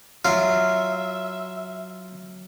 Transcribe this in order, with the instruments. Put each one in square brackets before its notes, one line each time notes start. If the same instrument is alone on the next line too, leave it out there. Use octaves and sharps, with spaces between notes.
[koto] F#3 [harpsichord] F4 [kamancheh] E5